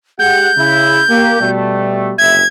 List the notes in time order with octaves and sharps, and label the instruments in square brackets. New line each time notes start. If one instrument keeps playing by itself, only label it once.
[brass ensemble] G#3 G4 F#5 [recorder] G6
[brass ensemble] C#3 E4
A#3 G4
B2 G3 A3
[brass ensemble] F#1 C2 E5 [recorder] G#6